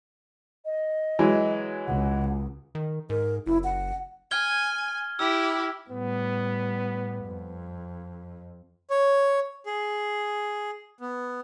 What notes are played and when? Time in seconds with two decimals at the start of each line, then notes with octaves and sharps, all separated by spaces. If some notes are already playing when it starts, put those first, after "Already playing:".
0.65 D#5
1.19 E3 F#3 G#3
1.87 C#2 F#5
2.75 D#3
3.10 G#2 A#4
3.46 F#1 E4
3.64 F#5
4.31 G#5 F6 G#6 G7
5.19 E4 G4 E6
5.89 A2 G3 B3
7.24 F2
8.91 C#5
9.66 G#4
11.01 B3